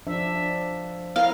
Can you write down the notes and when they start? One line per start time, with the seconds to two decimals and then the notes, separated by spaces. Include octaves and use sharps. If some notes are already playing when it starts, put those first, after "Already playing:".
0.07 F3 D4 E5
1.16 B3 E4 A#4 F5